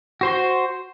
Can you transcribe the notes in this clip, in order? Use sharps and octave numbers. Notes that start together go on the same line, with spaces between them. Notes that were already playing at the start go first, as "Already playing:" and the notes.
F#4 C5 C6